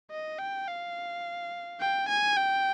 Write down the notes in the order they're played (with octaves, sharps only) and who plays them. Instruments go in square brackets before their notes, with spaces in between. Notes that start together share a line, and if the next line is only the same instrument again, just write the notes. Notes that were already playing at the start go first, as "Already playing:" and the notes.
[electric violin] D#5
G5
F5
G5
G#5
G5